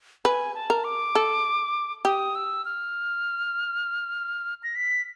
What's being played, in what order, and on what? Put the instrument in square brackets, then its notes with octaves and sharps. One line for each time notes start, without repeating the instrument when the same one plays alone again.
[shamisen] B4 [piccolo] G#5
[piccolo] A5
[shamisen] A#4
[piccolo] D6
[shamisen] A4
[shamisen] G4 [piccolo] D#6
[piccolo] E6
F6
A#6
B6